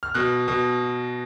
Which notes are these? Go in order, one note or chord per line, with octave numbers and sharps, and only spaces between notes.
F6
B2 F#6
B2